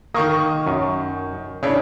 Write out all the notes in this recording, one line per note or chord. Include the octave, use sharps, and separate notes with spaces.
D#3 A#3 C#6 D#6
F#2
C#3 C#4 D4 E4